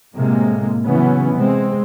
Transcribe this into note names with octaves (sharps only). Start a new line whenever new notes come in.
A2 C3 G#3 A#3
C#3 E3 F#3 B3 C#4
C3 G#3 C4